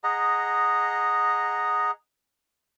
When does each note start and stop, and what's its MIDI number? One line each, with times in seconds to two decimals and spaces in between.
0.04 1.91 68
0.04 1.91 75
0.04 1.91 78
0.04 1.91 82